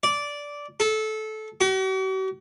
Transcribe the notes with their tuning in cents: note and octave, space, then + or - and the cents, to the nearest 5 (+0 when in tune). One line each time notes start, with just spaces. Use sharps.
D5 -10
A4 -20
F#4 +45